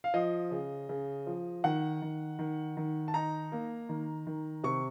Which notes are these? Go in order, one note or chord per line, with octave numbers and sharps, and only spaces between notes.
F5
F3 D#5
C#3
C#3
F3
D#3 F#5
D#3
D#3
D#3
A5
D#4 A#5
A#3
D#3
D#3
C3 C#6